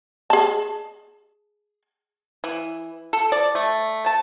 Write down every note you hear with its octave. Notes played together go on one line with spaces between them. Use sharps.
G#4 A5
E3
A4
D5
A3
A5